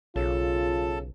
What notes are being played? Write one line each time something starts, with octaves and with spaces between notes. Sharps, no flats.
B1 C#3 F4 A4 A5